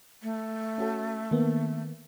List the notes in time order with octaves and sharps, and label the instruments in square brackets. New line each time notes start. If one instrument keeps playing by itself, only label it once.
[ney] A3
[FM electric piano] C#4 F#4 A4
D#3 A#3 B3